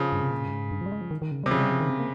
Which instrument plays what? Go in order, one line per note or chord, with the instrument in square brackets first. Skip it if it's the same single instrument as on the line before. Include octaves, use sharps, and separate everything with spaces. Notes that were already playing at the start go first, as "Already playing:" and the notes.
Already playing: [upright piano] C#3 F3
[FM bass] G2
C3
A#2
G2
G#2
G2
F3
G3
G#3
F3
D#3
D#3
C#3
G3
[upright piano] C3
[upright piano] C#3 [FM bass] F3
[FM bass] G3
F3
D#3
C4
A#3